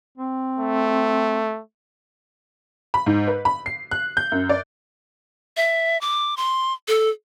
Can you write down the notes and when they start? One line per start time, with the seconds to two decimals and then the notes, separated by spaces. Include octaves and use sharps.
0.18 C4
0.58 A3
2.94 B5
3.06 G#2
3.28 B4
3.45 B5
3.66 C7
3.91 F#6
4.17 G6
4.32 F#2
4.49 D5
5.57 E5
6.01 D6
6.37 C6
6.88 A4